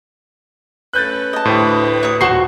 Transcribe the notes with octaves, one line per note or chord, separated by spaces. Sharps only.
A3 C#4 B4 F#6 G6 A6
D#5 A5
D2 A2 G4 B4 C5
C#5 D#6
D#1 F#4 C5 C#6 C7 E7